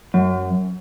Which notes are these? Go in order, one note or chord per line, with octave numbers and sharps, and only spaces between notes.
F#2